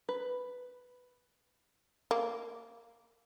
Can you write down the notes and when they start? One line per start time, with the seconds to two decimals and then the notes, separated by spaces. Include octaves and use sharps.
0.09 B4
2.11 A#3